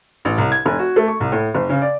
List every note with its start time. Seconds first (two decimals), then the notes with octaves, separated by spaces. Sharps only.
0.25 A1
0.38 C2
0.52 G#6
0.66 F1
0.79 F#4
0.96 A3
1.08 C#6
1.20 C2
1.32 A2
1.54 F#1
1.69 C#3
1.82 D5